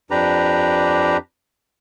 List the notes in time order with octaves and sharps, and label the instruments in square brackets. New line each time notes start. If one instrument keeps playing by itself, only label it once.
[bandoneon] F2 D4 G4 B4 A#5